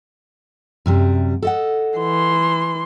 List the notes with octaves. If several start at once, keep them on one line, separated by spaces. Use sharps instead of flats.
F#2 C3 G3
A4 D#5 F#5
E3 C6